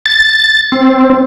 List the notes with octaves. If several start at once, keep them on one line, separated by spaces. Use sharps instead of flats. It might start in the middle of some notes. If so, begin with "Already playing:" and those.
A6
C4